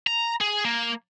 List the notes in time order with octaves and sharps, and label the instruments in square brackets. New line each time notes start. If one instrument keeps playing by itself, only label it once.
[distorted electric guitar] A#5
G#4
A#3